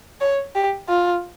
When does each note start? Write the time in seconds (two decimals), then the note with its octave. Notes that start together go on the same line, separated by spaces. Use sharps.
0.21 C#5
0.55 G4
0.89 F4